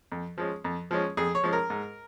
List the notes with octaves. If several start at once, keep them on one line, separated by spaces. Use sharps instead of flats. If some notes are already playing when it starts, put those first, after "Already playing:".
F2
F3 G#3 C#4
F2
F3 G#3 C#4
F2 G#4
C#5
F3 G#3 C#4
A#4
G#2